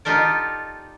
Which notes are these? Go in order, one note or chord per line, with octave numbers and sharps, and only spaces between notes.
D#4 F4 G4 A4 A#4 D5